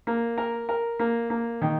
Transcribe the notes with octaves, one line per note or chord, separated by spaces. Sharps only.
A#3
A#4
A#4
A#3
A#3
D#3